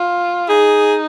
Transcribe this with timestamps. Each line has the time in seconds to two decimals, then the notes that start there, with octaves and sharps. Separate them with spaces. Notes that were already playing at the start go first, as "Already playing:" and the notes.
Already playing: F4
0.49 D#4 G#4